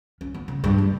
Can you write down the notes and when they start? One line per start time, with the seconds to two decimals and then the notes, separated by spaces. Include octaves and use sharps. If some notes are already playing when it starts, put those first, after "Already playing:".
0.21 C#4
0.34 B3
0.48 C#3
0.64 G2
0.78 F#1